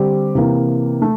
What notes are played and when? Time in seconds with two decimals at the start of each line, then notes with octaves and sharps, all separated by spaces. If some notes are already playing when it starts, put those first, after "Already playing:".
Already playing: D3 G3 C4 G4
0.35 C3 E3 A#3
1.02 A3